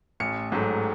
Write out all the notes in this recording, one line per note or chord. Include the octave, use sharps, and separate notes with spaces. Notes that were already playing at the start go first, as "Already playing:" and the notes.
A1 C#7
G#2 F#3 A3